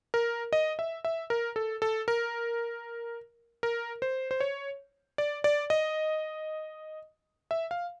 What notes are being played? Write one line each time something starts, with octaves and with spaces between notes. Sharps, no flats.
A#4
D#5
E5
E5
A#4
A4
A4
A#4
A#4
C5
C5
C#5
D5
D5
D#5
E5
F5